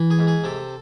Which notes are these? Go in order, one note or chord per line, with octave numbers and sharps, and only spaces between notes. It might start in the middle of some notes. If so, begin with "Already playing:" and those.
Already playing: E3
G#4
G#2
G#4
C3 A4